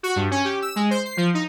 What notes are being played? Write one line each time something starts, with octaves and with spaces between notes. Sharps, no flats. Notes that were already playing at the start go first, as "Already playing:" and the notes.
F#4
G2
C#4
G4
E6
G#3
C5
C7
F3
D#4